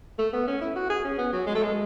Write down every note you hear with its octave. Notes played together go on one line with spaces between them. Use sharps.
A3
B3
C#4
E4
F#4
G#4
C#4
B3
F#3
G#3
A3
G#3